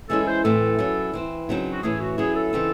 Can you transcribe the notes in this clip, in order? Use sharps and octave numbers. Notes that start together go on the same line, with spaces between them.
E3 G#3 C#4 E4 A4
C5
A2 E3 A3 C4 A4
F#3 C#4 E4
E3 C4 E4
C#3 F#3 C4 D#4
F#4
A2 E3 A3 C#4 G#4
F#4
F#3 C#4 E4 G#4
A4
C#3 E3 C4 D#4